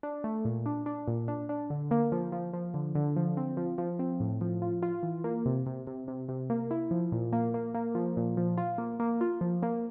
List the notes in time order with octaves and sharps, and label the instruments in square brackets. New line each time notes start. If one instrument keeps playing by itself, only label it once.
[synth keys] D4
A3
A#2
D4
D4
A#2
D4
D4
D3
A#3
F3
F3
F3
D3
D3
F3
C4
F3
F3
C4
A2
F3
F4
F4
E3
A#3
C3
C3
C3
C3
C3
A#3
E4
F3
A#2
A#3
A#3
A#3
F3
A#2
F3
F4
A#3
A#3
F4
F3
A#3